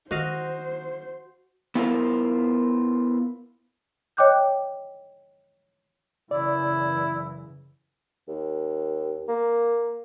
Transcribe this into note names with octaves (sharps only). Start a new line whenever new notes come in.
D#3 F#4 C5 D#5 F5
B3 E4 F4 G4 A#4 C5
C#5 D#5 G5 D6 F#6 G6
F#2 C#3 E3 E4 D5
D#2
A#3